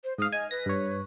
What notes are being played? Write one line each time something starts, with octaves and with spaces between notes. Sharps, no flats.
C5
G#2 F5 D#6
D#5 G#5
B4 A#6
G2 C#5